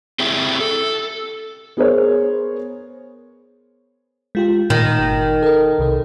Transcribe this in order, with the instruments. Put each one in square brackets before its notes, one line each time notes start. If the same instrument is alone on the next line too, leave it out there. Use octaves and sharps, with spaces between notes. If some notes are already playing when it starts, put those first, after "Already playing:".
[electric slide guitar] C4 E4 G4 G#4 E5
A4
[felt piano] B3 G#4 A#4 C5 C#5
[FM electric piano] G#3 F4 G4
[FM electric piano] A#2 [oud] D#3
[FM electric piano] G1
A4 A#4
C2 C3 A4